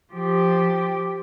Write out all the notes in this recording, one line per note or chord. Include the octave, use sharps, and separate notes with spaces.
F3 G4